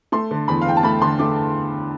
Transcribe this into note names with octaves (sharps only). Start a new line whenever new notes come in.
A3 C6
D3
E2 B5
F5
E2 G5
A5
A3 B5
D3 C6
A3 D6